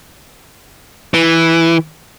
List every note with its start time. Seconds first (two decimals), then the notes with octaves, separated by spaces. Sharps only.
1.14 E3